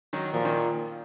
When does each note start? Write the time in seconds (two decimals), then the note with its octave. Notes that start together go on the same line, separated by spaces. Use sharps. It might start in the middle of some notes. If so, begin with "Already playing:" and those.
0.13 D#3 F#3
0.33 A#2 F3
0.45 D#3